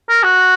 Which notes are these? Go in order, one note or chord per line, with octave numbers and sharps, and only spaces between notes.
A#4
F#4